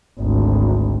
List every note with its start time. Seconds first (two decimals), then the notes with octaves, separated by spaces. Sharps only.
0.20 G#1 D2